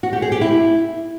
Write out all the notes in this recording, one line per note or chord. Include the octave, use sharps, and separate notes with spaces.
F#4
G4
G#4
G4
E4